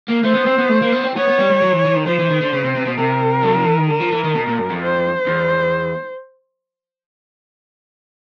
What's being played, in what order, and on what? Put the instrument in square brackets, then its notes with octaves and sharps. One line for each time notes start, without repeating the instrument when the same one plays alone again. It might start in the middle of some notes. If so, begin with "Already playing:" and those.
[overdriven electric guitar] A#3
[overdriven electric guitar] A3 [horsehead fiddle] C5
[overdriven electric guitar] B3
C4
B3
A3
A#3
B3
C4
[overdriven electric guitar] B3 [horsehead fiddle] C#5
[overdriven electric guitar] B3
G3
G3
F#3
E3
E3
D#3
[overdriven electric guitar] F3 [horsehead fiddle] C5
[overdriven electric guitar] E3
D#3
D3
C#3
C3
C3
B2
[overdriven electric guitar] C3 [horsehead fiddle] A#4
[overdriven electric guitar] F#3
F3
E3
D#3
[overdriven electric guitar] D3 [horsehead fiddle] A#4
[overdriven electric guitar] F3
E3
D#3
B2
A#2
F#2
F2
[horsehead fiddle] C5
[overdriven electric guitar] E2